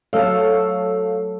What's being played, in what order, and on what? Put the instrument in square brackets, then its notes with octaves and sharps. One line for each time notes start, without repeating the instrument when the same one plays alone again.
[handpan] F#3 A3 A4 [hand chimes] C#5 E6 [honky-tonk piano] F5 F6